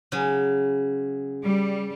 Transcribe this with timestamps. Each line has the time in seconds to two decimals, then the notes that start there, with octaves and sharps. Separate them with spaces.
0.12 C#3 F#3
1.43 G3